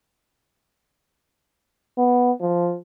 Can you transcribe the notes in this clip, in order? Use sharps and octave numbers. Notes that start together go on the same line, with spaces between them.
B3
F3